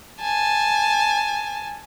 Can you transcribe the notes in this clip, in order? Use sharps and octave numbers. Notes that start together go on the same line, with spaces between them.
G#5 A5